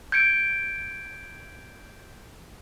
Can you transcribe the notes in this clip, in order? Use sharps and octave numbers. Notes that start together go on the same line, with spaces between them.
G6 G#6 C#7 D7